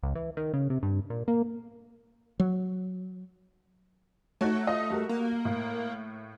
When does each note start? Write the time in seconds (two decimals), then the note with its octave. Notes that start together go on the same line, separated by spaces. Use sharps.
0.03 C#2
0.15 E3
0.37 D#3
0.54 C#3
0.70 C3
0.83 G2
1.10 A#2
1.28 A#3
2.40 F#3
4.41 A3 D#4 F#4 C#5
4.67 F4 D#5
4.90 G3 F#4 A#4
5.09 A#3
5.45 A2